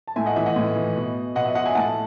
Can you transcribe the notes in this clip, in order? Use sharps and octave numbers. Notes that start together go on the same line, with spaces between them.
A5
A2 E5 G#5
D#5 F#5
E3 E5
D#5 F#5
A2
E3
B2
B2 D#5 F#5
E5
D#5 F#5
E5 G#5
A2 F#5 A5